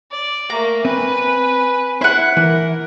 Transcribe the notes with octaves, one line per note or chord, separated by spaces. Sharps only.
D5
A3 A#3 A#5
C4 B4 G#5
E4 C5 F#5
E3 A#4